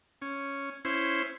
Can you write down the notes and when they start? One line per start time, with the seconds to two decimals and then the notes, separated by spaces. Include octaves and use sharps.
0.22 C#4
0.85 C#4 E4 C5